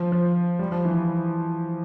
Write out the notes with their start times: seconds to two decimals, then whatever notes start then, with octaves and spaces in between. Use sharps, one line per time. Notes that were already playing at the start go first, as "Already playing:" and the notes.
Already playing: F3
0.12 F3
0.59 G3
0.72 F3
0.85 E3